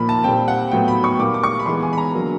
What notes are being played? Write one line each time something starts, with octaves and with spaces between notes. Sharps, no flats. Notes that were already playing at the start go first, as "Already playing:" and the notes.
Already playing: A#2 F3 A#3 B5
A5
A#2 G3 C4 G5
F#5
A2 F#3 B3 G5
B5
C#6
A#2 G3 A#3 D6
D6
C#6
B5
E3 G#3 B3 C6
G#5
B5
A#5
D3 F#3 A#3